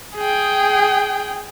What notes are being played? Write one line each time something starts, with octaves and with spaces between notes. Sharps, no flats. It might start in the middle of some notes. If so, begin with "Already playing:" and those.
G#4 G5